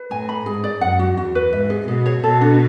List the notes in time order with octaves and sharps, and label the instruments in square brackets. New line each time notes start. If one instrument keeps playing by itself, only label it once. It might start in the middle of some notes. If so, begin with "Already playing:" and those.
Already playing: [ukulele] B4
[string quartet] A2 [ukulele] G#5
[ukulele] B5
[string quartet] G#2 [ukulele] G#4
[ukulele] D5
[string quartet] F#2 [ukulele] F#5
[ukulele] F#4
[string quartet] E2 [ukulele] F#4
[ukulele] B4
[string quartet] G#2 [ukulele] E5
[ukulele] G#4
[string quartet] B2 [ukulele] G#4
[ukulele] C#5
[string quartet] B2 [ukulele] A4
[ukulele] D4